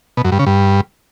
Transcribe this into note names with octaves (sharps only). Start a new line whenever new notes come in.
B2
F#2
G2
C#3
G2